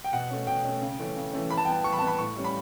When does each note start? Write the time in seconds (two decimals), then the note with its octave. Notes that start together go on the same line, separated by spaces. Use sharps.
0.04 G5
0.13 B2 F#5
0.30 A3 C#4
0.47 B2 G5
0.65 A3 C#4
0.82 C#3
0.99 E3 A3 C#4
1.16 C#3
1.33 E3 A3 C#4
1.50 E3 B5
1.57 A5
1.65 B3 G5
1.72 A5
1.84 E3 C#6
1.93 B5
1.99 A5
2.02 B3
2.07 B5
2.19 A2 C#6
2.36 G3 C#4
2.44 B5